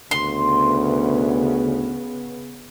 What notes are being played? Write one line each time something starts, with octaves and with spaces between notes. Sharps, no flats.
D2 C#3 B3 C6